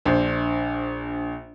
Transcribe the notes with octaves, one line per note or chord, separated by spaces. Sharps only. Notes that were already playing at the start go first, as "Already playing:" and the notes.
A#1 D4 C5